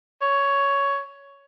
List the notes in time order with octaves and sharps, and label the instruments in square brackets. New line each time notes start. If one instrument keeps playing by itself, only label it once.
[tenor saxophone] C#5